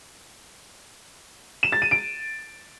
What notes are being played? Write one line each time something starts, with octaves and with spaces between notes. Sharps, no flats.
E7
A6
D#7
D7